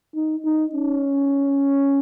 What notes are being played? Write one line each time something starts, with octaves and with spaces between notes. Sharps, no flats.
D#4
D#4
C#4